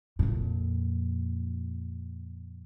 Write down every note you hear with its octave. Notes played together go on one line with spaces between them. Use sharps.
F2 A#2